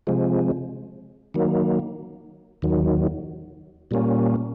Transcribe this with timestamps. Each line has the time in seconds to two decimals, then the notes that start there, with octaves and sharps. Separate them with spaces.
0.07 C3 F3 G#3
1.34 D#3 F#3 A#3
2.62 D#2 D#3 F#3
3.91 A#2 G3 A#3 C#4